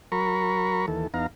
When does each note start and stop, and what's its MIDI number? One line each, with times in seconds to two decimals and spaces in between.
0.12 0.86 54
0.12 0.86 70
0.12 0.86 82
0.12 0.86 83
0.12 0.86 85
0.88 1.07 39
0.88 1.07 52
0.88 1.07 69
1.14 1.26 40
1.14 1.26 59
1.14 1.26 63
1.14 1.26 77
1.14 1.26 82